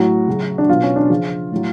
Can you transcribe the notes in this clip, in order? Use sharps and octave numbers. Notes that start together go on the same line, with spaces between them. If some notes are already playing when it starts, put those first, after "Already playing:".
Already playing: A2 F#3 F#4
C#3 F#3
D4
B2 F#3 F4
C#4
D4
C#3 F3 F4
A2 F#3